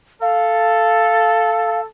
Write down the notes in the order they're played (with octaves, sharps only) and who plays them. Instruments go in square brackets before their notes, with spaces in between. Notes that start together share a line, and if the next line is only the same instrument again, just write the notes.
[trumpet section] A4 [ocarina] F5